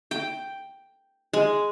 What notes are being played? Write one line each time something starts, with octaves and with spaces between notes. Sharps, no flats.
G5
G#3